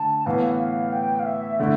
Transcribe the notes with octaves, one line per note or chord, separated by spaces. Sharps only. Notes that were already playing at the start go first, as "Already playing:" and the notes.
Already playing: D3 A3 A5
A2 E3 B3 F5
F5
G5
F5
E5
D3 A3 E4 E5